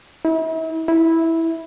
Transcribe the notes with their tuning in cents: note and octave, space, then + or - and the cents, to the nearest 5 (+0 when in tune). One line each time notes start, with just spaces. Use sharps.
E4 -40
E4 -10